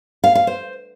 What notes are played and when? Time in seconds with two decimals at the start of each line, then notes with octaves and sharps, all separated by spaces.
0.24 F5
0.35 F5
0.47 C5